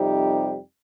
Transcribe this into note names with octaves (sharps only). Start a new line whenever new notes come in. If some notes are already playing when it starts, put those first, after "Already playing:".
Already playing: F2 C3 G3 D#4 G4